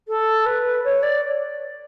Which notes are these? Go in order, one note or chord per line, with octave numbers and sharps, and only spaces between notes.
A4
B4
C#5
D5